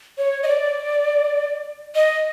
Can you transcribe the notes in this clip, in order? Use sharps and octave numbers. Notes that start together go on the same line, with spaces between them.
C#5
D#5
D5
D#5